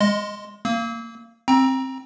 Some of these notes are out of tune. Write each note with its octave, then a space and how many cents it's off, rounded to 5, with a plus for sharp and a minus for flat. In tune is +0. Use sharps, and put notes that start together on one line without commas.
G#3 -20 D#5 +0 C6 +0
A#3 -20 E6 -35
C4 +10 G5 +30 A#5 +25